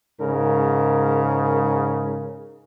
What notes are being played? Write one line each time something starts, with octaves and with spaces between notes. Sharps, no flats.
G#2 C#3 A#4